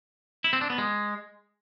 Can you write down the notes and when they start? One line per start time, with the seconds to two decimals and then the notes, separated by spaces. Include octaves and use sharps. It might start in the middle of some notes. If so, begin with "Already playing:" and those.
0.44 E4
0.53 C4
0.61 D4
0.70 B3
0.78 G#3